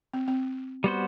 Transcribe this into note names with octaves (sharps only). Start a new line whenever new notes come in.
C4
C4
G3 B3 F#4 C5